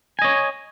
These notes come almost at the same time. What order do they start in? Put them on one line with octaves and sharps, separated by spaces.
G#5 D#5 C#5